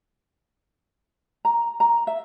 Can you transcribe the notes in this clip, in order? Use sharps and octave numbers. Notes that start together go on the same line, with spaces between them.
A#5
A#5
E5